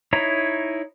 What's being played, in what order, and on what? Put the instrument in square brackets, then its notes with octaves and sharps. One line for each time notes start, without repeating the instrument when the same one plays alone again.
[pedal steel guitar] D#4 E4 C#5 A#5